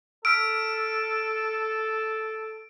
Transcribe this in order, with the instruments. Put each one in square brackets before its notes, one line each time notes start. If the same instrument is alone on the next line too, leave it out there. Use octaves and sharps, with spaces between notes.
[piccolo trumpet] A4 [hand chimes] E6 F6 B6 [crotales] D7